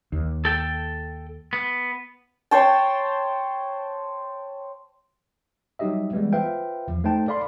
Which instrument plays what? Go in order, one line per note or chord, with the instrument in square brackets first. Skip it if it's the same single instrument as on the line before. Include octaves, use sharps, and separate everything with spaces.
[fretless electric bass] D#2
[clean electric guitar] A4 G5
B3
[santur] C5 C#5 G5 A5
[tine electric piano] F#3 G3 D#4 G4 D#5 E5
E3 G3 G#3 B3
F4 B4 C5 E5 F5 G5
E2 F3
A3 D#4 C5 G5 A5
A4 D5 F5 B5 C6